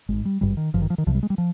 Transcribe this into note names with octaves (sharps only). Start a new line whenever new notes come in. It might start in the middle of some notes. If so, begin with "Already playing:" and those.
G#1 G#2 G#3
G3
G#1 G2 G3
D#3
G#1 G2 F3
D#3
F3
D#3
C2 C3 F3
G3
G#3
G3
F3